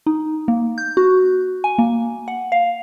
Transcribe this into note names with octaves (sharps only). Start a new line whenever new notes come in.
D#4
A#3
G6
F#4
G#5
A#3
F#5
F5